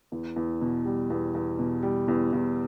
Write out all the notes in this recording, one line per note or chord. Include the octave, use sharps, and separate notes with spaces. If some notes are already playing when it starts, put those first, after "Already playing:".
E2
E2
B2
G3
E2
E2
B2
G3
E2
E2